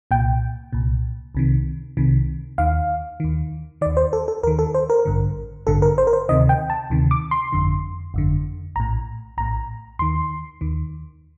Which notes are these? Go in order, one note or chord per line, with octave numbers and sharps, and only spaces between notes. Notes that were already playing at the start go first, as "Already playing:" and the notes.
C2 A#2 G5
C2 A#2
C2 C3 D#3
C2 C3 D#3
D#2 D#3 F5
D#2 D#3
D#2 D#3 D5
C5
A4
A4
D#2 D#3 A#4
A4
C5
A#4
A1 G2 D3
A1 G2 D3 A4
A#4
C5
A#4
C5
D2 C3 D#3 D#5
G5
A5
D2 C3 D#3
D6
C6
G1 F2 D3
G1 F2 D3
A#1 A2 A#5
A#1 A2 A#5
D#2 D#3 C6
D#2 D#3